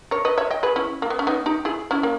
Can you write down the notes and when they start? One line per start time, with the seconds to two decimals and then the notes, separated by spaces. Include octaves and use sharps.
0.11 A#4 C#5
0.25 B4 D#5
0.38 C#5 E5
0.50 D#5 G5
0.63 G#4 B4
0.76 C#4 E4
1.02 A#3
1.10 B3
1.19 C#4
1.27 B3 D#4
1.46 D#4 G4
1.65 E4 G#4
1.91 C#4 E4
2.03 A#3